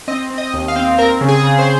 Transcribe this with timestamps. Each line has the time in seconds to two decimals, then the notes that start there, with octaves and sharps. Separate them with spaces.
0.08 C4 D#5
0.30 C4
0.38 D#5
0.53 D#2
0.68 F5
0.76 C4
0.98 C4 A#4
1.21 C#3
1.28 G#4
1.43 C#3
1.59 C5